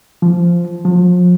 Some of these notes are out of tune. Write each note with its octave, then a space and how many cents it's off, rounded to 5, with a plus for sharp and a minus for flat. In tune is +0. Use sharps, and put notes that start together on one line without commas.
F3 -10
F3 +35